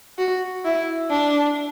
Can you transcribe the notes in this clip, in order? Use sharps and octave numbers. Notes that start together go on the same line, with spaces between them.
F#4
E4
D4